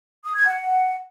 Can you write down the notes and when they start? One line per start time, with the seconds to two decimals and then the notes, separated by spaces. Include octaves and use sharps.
0.25 D#6
0.36 G#6
0.47 F#5